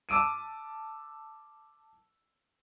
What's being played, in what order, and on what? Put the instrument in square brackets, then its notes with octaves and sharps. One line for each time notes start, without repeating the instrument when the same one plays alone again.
[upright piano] A5 D6 E6 D7 D#7